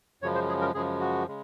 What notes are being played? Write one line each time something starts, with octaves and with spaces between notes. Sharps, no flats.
F#2 C#3 F3 G#3 C#5
C5
G#4
A#4
F#2 C#3 F3 G#3 G#4
F#4
C#3 G#3